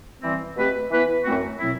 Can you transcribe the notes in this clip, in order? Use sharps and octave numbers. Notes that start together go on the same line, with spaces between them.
E3 G3 C4
B2 A3 C4 G4 B4
E3 B3 E4 B4
F#2 E3 A3 C4 F#4
B2 F#3 C4 E4